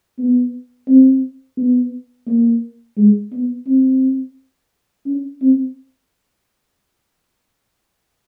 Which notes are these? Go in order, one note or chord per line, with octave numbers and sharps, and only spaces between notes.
B3
C4
B3
A#3
G#3
B3
C4
C#4
C4